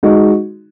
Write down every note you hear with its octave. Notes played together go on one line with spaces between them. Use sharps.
G#3 D#4 F#4